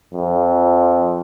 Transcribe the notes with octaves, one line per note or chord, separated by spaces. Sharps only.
F2